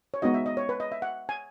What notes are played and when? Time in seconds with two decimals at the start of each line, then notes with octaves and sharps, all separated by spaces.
0.14 C#5
0.22 G#3 B3 D#4 F#4 D#5
0.34 E5
0.46 D#5
0.57 C#5
0.69 B4
0.80 D#5
0.92 E5
1.02 F#5
1.29 G#5